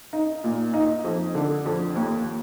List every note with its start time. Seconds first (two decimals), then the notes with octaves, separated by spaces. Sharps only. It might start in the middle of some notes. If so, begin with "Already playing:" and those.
0.13 D#4
0.44 A#2
0.74 D#4
1.04 F2
1.35 D3
1.66 F2
1.95 D#2